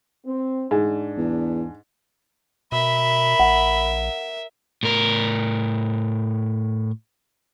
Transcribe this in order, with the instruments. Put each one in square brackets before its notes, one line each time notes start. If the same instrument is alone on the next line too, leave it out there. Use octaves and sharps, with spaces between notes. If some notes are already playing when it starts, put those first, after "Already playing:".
[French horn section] C4
[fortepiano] G#2 [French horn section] D4
[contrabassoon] E2
[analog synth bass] B2 [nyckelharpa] A#4 E5 [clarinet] B5
[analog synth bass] A#1 [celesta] F#5
[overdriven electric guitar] A2 A#4